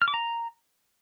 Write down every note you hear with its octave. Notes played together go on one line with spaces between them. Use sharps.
F6
D6
A#5